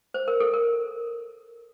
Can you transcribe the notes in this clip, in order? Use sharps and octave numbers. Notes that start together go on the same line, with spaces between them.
C5
A#4
A4
A#4